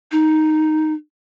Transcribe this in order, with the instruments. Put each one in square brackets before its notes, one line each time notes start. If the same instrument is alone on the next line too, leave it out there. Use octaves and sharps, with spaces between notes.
[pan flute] D#4